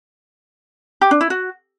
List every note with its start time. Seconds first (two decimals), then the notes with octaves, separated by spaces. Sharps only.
1.01 G4
1.11 D4
1.21 E4
1.30 F#4